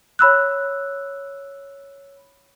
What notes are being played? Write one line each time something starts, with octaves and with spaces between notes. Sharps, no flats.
C#5 B5 E6 F#6